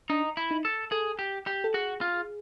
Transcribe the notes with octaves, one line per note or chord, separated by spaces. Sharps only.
D4 D#4
E4
D#4
A4
G#4 A4
G4
G4
A4
F#4 G#4
F4